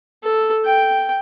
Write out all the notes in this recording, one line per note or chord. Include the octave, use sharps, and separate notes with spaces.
A4
G5